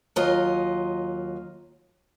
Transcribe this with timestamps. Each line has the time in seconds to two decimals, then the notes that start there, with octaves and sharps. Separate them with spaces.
0.16 D#2 F#3 F4 D#5